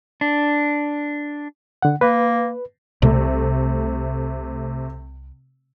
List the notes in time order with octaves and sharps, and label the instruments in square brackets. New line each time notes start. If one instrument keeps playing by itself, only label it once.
[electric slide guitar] D4
[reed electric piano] D3 F#5
[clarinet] A#3 [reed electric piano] B4
[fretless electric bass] C2 [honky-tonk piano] C3 A3